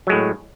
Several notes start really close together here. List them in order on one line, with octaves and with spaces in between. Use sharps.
F#3 G#3 A2